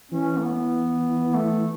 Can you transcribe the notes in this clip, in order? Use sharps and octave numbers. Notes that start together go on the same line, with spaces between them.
E3 C#4
A3
B3
A3